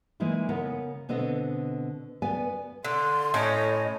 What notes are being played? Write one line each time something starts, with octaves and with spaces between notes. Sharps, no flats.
E3 G#3 A#3 D#4 E4
C#3 B3 A#4 F#5
B2 D3 B3 C4 D#5
B3 B4 D5 G#5
D3 C6
A2 C#4 D#5